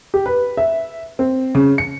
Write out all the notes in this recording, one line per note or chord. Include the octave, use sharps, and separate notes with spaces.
G4
B4
E5
C4
C#3
C#7